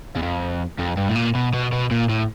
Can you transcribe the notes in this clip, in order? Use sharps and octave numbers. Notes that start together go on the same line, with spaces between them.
E2
F2
F2
G2
A2
A#2
B2
B2
B2
A#2
A2